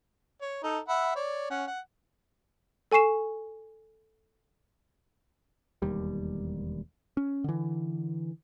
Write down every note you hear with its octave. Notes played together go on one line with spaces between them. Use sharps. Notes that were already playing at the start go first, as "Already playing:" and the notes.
C#5
D#4 A4
E5 F#5 B5
C#5 D5
C#4 F#5
F#5
A4 G#5 C#6 C7 E7
E1 D#2 G3
C#4
D3 E3